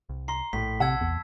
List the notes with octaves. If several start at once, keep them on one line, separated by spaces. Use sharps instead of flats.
C2
A#5 C6 C7
A#1 A2 B6
C3 F#5 A5 E6 G#6
E2